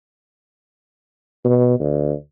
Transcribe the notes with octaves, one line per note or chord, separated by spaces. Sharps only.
B2
D2